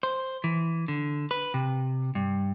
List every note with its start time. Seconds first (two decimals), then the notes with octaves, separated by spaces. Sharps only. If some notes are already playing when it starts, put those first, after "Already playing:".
0.03 C5
0.44 E3
0.88 D3
1.31 B4
1.54 C3
2.15 G2